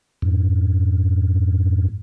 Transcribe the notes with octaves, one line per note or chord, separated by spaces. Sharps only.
F2 G#2